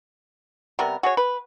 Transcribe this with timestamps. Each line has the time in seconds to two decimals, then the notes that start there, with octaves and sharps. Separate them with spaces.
0.79 C3 G3 B3 A#4
1.03 F#4 G#4 C#5
1.17 B4